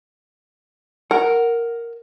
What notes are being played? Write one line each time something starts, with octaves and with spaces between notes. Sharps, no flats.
A#4 F#5